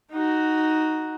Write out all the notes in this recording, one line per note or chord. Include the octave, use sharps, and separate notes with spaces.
D#4 F#4